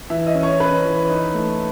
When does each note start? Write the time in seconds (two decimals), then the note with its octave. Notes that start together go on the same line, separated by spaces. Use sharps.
0.10 E3 E5
0.27 D#5
0.35 C#4
0.43 C#5
0.60 C#4 B4
0.85 E3
1.09 D#4
1.34 A3